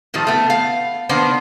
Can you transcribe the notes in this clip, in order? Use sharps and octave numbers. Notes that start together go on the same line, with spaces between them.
A2 D#3 F3 G3
A3 B3
F5
D#3 A#3 B3 D4 C5